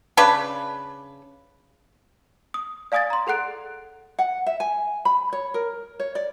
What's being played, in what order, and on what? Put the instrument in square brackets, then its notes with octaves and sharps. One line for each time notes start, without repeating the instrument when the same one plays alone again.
[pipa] C#3 D4 B4
[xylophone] D#6
D5 F5 G#5 D#6 G#6 A6
A#5 C6
G#4 A4 F#5 F#6 D7
[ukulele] F#5
E5
G#5
B5
C#5
A#4
C#5
D5